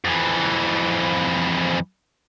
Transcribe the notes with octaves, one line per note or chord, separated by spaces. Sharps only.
F2 E3